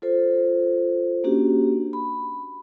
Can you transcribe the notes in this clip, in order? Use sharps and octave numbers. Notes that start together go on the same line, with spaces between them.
F4 A4 C5
A#3 C#4 D4 F#4 G4
B5